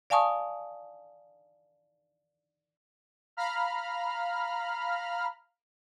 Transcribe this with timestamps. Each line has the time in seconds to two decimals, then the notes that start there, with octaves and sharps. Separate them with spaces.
0.10 D5 F5 G#5 A5 C#6 D#6
3.37 F5 A#5 B5 F6